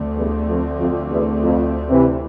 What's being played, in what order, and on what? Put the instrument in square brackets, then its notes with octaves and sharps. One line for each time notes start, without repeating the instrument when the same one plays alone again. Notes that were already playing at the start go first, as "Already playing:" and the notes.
Already playing: [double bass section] D2 D3 A3 C4
[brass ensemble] E2 G2
F2
F2
E2
F2
C3 E3